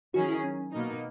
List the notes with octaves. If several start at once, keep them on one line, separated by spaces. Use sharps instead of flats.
D#3 F#3 C#4 F#4 G#4
E4
C#4
B2 A#3 D#4